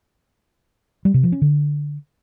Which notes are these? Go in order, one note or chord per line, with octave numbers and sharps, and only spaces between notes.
G3
C3
F3
C#4
D3